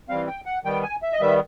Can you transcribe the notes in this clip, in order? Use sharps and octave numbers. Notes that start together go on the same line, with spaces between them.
E3 G3 C4 F5
G5
F#5
D#3 G3 B3 G5
G#5
E5
D#5
D#3 G3 B3 E5